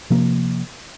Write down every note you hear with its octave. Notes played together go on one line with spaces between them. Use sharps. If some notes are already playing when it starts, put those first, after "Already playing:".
C3 F3 A#3